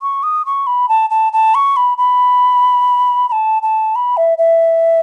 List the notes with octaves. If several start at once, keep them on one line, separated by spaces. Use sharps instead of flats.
C#6
D#6
C#6
B5
A5
A5
A5
C#6
B5
B5
B5
A5
A5
B5
E5
E5